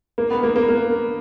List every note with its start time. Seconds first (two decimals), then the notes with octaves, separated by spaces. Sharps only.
0.18 A#3
0.30 B3
0.43 A#3
0.56 A#3
0.68 A#3